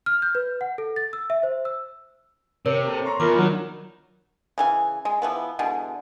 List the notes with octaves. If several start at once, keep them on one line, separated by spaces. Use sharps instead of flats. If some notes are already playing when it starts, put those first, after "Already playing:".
F6
G6
B4
F#5
A4
A6
E6
E5
C5
E6
C3 A#4 C#5
A#3 A4 C5
A#5 C6 C#6
E2 F4 A#4 D6
D#3 F#3 A#3 D4
C#3 E3 G#5
G#3
E3 F3 B3
B2 D3 E3 G#3